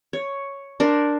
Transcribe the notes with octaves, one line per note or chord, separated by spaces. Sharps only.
C#5
D4 A#4 C5